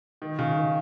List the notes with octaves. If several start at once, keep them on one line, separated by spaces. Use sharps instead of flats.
D#3
C#3
D#3